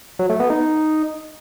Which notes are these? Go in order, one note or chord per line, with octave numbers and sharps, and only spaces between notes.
F#3
A3
B3
D#4